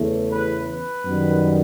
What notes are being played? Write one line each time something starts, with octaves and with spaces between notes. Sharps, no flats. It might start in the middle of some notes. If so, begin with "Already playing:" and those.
Already playing: E2 C#3 E3 A3
B4
B4
F#2 D#3 G3 B3